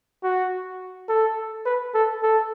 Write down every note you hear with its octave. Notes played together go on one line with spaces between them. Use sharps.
F#4
A4
B4
A4
A4